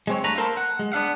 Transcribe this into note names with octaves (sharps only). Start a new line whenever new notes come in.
G#3 C4 C#5
G2 A3 B4 A#5
A#3 A4 A#4 C5
F#5
G#3
B3 D4 F5 F#5